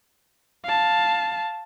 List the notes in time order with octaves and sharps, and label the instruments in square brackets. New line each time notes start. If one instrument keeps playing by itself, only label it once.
[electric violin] F5 A5